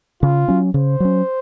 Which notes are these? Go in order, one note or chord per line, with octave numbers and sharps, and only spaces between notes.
C#3 F4
F#3 C#4
C#3 C5
F#3 C#4